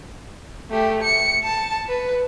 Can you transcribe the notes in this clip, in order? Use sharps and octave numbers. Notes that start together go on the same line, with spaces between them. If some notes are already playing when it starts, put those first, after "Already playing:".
A3 G4
C#7
A5
B4